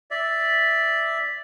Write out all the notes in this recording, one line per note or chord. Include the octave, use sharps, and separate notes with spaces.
D5 E5